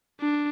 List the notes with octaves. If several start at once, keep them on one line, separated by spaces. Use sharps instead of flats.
D4